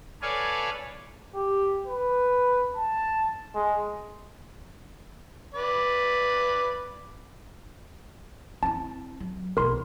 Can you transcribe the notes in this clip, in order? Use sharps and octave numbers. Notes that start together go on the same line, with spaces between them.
A4 B4 C#5 D5 F5 G#5
G4
B4
A5
G#3
B4 D5
C4 E4 A5
F#3
B1 E2 A#4 C6